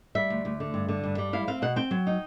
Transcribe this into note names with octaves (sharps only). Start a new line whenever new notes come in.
G3 E5
D2
D2
D3
G2
D3
G2
G3
E4 F5
C4 F5
B2 F#5
C4 G5
F#3
D#4